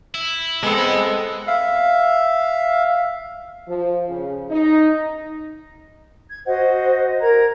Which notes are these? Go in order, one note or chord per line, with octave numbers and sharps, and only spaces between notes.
E4
G#3 B3 C4 A4
E5 F5
F3
C#3
D#4
G#6
F#4 C5 D#5 F#5
A#4 A#5 G#6